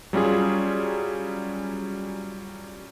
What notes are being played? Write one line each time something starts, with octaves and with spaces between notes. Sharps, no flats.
F#3 G3 C#4 F4 G#4